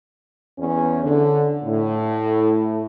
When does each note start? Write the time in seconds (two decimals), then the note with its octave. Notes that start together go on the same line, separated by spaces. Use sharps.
0.58 E2 C#4
1.04 D3
1.64 A2